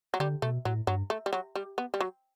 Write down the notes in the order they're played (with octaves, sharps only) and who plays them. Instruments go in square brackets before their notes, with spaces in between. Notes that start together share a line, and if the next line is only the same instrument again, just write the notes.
[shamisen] F#3
[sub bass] D3 [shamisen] G3
[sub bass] B2 [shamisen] A3
[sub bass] A2 [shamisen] F#3
[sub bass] G2 [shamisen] F#3
[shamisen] A3
G3
F#3
G3
B3
G3
F#3